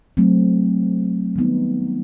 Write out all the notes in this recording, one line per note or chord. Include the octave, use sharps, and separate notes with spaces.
F#3 A3 C4
D#3 G3 B3 D#4